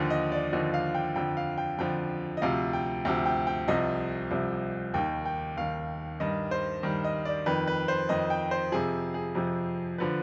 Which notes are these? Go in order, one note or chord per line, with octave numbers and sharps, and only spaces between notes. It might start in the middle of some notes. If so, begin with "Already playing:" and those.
Already playing: D#2 D3 F3
D#5
D5
D#2 D3 F3 D#5
F5
G5
F2 D3 F3 G5
F5
G5
F2 D3 F3 G5
D#5
D2 C3 F3 F5
G5
D2 C3 F3 G5
G5
G5
C2 C3 F3 D#5
C2 C3 F3
D#2 D#3 G5
G5
D#2 D#3 F5
G2 D#3 D#5
C5
G2 D#3
D#5
D5
F2 D#3 B4
B4
C5
F2 D#3 D#5
G5
C5
F2 C3 F3 G#4
G#4
F2 C3 F3
D3 F3 B4